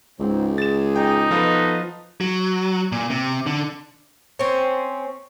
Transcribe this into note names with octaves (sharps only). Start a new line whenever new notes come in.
C#2 G#2 C4
G#4 A6 E7
D#4 G5
F3 B3 F4 A4 B4 D#5
F#3
A#2
C3
D3
C4 C#4